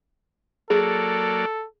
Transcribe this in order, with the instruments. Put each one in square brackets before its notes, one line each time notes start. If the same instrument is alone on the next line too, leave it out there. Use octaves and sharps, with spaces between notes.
[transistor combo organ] F#3 A#3 D5 [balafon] G#4 [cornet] A4